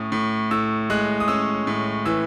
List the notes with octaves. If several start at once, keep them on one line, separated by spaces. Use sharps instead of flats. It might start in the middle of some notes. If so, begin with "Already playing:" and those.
Already playing: A2 C#4 D#6
A2
A2 E6
G#3 F#6
D#6
C#4 E6
A2
E3 E6